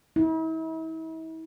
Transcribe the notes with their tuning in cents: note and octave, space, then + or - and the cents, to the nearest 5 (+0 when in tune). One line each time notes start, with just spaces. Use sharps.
E4 -40